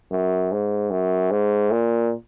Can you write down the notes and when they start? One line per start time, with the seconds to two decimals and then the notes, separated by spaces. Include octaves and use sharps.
0.12 F#2
0.52 G#2
0.91 F#2
1.31 G#2
1.71 A#2